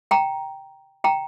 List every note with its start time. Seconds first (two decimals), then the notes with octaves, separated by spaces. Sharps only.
0.11 G5 A#5
1.04 G5 A#5